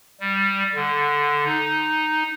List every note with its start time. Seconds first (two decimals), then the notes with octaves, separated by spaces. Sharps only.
0.20 G3
0.75 D3
1.45 D#4